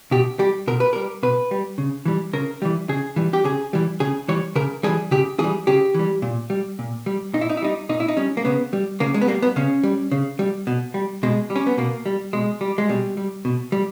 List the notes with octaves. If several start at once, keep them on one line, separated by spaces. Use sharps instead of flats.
B2 G4
G3 G4
B2 A#4
B4
G3 A#4
B2 B4
G3
C#3
E3 G3
C#3 A#4
E3 G3
C#3 G#4
E3 G3
G4
C#3 G#4
E3 G3
C#3 G#4
E3 G3 C#5
C#3 A#4
E3 G3 G#4
C#3 G4
E3 G3 G#4
C#3 G4
E3 G3
A#2
G3
A#2
G3
A#2 D#4
E4
D#4
E4
G3 D#4
A#2 D#4
E4
D#4
G3 C#4
A#3
C#3 B3
G3
C#3 A#3
G#3
B3
G3 A#3
B3
C#3 C#4
G3
C#3
G3
B2
G3
B2 G#3
G3
C#4
B3
B2 A#3
G3
B2 G#3
G3
G#3
B2 G3
G3
B2
G3